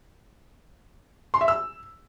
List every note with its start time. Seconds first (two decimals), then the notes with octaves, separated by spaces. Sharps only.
1.34 C6
1.41 E5
1.48 E6